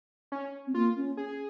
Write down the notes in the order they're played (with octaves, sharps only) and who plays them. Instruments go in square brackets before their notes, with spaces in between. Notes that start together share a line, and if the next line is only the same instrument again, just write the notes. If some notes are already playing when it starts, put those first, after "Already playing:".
[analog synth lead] C#4
[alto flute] C4
[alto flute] A#3 [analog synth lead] F4
[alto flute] C#4
[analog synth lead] G#4